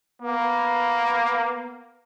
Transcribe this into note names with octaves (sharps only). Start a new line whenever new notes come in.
A#3 B3